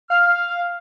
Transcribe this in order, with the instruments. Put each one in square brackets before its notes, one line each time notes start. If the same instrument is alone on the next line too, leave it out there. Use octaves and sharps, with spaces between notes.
[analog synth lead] F5 [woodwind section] F6